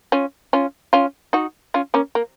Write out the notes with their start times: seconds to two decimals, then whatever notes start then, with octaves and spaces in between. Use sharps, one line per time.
0.12 C#4 F4
0.53 C#4 F4
0.93 C#4 F4
1.33 D#4 F#4
1.74 C#4 F4
1.94 A#3 C#4
2.15 A#3